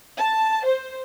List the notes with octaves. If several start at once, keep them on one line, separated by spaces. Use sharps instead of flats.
A5
C5